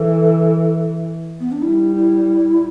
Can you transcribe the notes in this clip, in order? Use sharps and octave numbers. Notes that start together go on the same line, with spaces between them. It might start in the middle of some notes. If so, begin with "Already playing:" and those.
Already playing: E3 A4
B3
D4
G3 E4
E4